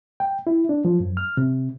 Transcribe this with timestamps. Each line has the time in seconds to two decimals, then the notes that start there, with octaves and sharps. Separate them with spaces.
0.20 G5
0.47 E4
0.69 D4
0.85 F3
1.00 F#2
1.17 F6
1.37 C3